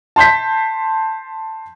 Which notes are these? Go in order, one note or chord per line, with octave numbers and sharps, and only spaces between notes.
A5 C6 G6 B6